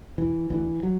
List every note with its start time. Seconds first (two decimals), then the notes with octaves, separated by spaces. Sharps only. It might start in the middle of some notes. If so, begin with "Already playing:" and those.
0.18 E1 E3
0.50 D2 D3 E3
0.83 F#3